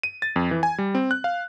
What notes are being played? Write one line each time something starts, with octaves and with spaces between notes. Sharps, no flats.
D#7
A6
F2
E3
G#5
G3
C4
F#6
F5